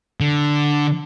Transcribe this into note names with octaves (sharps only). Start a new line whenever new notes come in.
D3